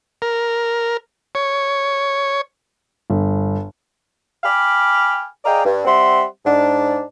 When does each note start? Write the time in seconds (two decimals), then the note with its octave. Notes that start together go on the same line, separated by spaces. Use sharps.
0.22 A#4
1.35 C#5
3.10 G1
4.43 G5 G#5 B5 D6 F6
5.45 G#4 D5 D#5 F5 G5 A#5
5.65 G2
5.85 G3 C4 E5 F#5 C6
6.45 G#2 D4